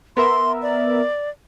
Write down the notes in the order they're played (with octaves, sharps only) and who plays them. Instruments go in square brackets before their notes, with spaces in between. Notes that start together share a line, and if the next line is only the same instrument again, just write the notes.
[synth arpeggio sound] B3 A#4 E5 [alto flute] C6
[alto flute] D5